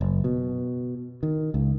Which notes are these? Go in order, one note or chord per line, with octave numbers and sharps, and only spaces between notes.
F#1
B2
D#3
C#2